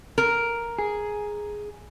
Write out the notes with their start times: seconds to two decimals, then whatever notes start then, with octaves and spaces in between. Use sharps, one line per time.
0.18 A#4
0.79 G#4